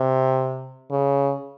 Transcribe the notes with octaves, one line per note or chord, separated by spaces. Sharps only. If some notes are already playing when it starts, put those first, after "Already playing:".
Already playing: C3
C#3